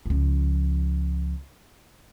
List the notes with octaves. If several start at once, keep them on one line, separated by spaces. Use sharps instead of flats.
C#2 F3